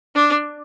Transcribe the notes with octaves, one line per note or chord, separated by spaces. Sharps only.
D4